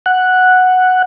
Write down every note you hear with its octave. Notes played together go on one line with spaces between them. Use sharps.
F#5